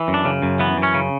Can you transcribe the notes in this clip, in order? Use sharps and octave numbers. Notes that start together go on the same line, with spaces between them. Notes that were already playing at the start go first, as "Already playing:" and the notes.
Already playing: E3
F#2
D4
C#3
F#2
E3 B3
F#2
C#4
C#3